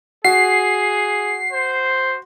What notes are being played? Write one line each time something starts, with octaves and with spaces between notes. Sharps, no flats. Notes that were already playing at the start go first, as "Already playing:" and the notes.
F#4 G#4 C7
C5